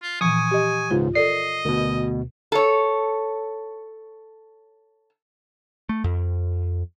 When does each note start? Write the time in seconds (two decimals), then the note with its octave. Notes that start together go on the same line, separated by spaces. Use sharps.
0.02 F4
0.21 A#2 E3 F3 G#5 C#6 D#6
0.51 G4 D#5
0.91 C#2 G#2 F4
1.15 A4 A#4 D5 D#5 C7
1.65 D2 B2 A#4
2.52 A4 C#5
5.89 A3
6.04 F2